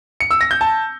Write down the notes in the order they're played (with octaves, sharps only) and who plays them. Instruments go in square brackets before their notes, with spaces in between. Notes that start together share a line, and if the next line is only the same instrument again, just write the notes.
[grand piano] C#7
E6
A#6
G6
A5